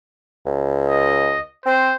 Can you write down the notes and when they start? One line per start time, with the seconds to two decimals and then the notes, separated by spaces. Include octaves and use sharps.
0.46 C#2
0.89 D#5
1.66 C4 C5